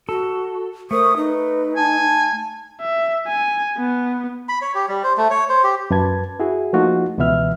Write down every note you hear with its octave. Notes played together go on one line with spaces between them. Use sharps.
F#4 A4
A3 A#4 C5 C#6 D#6
D#4 B4
G#5 A5
E5
G#5
B3
B5
C#5
G4
G3
C5
A3
C#5
C5
G4
F#2 B4 A5 G#6
E4 F#4 G#4
F3 A3 A#3 D#4 F4 F#4
C#2 B2 E3 B3 E5 F6